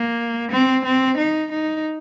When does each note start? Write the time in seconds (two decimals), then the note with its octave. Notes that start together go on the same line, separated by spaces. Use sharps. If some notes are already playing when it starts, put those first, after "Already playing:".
Already playing: A#3
0.51 C4
0.85 C4
1.17 D#4
1.52 D#4